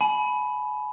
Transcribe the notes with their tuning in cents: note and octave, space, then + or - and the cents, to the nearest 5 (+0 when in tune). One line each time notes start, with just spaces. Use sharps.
G#5 +35 B5 +0